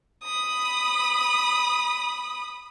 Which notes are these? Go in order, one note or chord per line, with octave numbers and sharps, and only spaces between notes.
B5 D#6